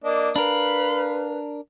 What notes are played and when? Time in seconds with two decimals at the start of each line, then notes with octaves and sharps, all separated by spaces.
0.04 A#3 D4 D#5
0.36 D4 A#4 B4 F5 B5